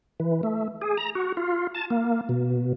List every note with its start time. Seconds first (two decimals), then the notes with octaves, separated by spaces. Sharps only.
0.20 E3
0.43 A3
0.81 G#4
0.97 A#5
1.15 F#4
1.37 F4
1.75 A5
1.90 A#3
2.29 B2